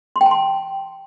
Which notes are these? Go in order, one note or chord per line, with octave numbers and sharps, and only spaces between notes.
C6
G5
A5
C6